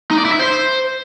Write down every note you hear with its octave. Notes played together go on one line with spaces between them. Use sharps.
D#4
D5
E4
E5
C5